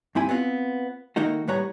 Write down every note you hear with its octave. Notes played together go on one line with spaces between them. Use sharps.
G2 C4 E4 G#5
B3 C4 D#4 F4
D#3 A3 A#3 D#4 F#4
A2 G3 B4 C#5 F#5 A#5